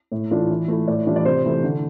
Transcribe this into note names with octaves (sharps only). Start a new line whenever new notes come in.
A2
E3 A3 D4 F4
E3
A3 E4
A2 D5
E3 G3 D4 F4
D5
C3 C5
E3 A3 E4
D3